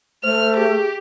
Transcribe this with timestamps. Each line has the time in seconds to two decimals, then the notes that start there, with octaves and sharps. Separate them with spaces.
0.24 A3 C5 F6
0.56 G4 G#4